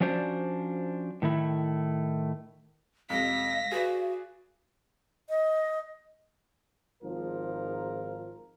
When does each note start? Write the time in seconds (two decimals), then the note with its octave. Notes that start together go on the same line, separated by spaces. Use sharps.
0.01 F3 C#4 D4 F#4 C5 D5
1.22 A2 D#3 A3 E4
3.10 F2 C3 G#3 F5 A#6 B6
3.72 F#4 G#4 B4 D5
5.30 D#5
7.02 G#1 G#2 F3 F4 A#4